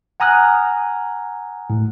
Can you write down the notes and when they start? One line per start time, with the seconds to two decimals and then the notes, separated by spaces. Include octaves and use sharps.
0.20 F#5 G#5 A#5 D#6 F6 F#6
1.70 A2